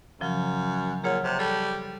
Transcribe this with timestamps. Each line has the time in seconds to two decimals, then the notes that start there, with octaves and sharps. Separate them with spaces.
0.21 F#2 C#3 F3 F#3
1.04 A#2 G#4 C#5 F#5
1.24 C3
1.39 G3 A4 A5